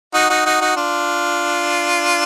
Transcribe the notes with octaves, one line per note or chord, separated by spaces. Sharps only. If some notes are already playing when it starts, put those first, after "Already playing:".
D#4 F#4
D#4 F#4
D#4 F#4
D#4 F#4
D4 F4